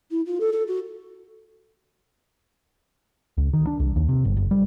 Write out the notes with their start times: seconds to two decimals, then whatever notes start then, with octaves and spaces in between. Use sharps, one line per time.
0.10 E4
0.26 F4
0.40 A4
0.52 A4
0.67 F#4
3.38 C#2
3.53 D#3
3.67 D4
3.80 C2
3.96 D#2
4.09 C3
4.25 G1
4.37 F#1
4.51 G3